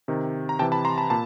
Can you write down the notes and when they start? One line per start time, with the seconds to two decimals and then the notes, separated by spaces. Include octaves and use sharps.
0.08 C3 D#3
0.49 A#5
0.59 C3 E3 G5 A5
0.72 A5 B5
0.85 A#5 C6
0.98 A5 B5
1.10 A#2 A5 B5